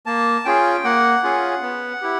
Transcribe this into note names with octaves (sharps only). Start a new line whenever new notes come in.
A#3 A5
C#4 F4 G#4 G5
A#3 F#5
C#4 F4 G#4
B3
E4 G4